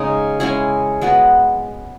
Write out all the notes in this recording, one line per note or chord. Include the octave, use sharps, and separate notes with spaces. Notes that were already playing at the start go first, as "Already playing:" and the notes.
Already playing: C#3 G#3 D#4
G#3 C#4 E4 G#4
G#3 B3 F#4 B4